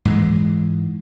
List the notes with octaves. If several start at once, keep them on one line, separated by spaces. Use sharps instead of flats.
G#2 E3 G#3